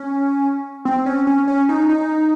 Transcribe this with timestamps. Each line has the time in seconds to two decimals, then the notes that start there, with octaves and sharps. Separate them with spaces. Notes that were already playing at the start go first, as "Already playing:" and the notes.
Already playing: C#4
0.85 C4
1.06 C#4
1.27 C#4
1.48 C#4
1.69 D#4
1.89 D#4